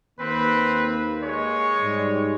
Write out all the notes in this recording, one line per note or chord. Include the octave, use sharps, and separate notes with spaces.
D#2 A#3 C4 B4
G#3 C#5
G#2 G3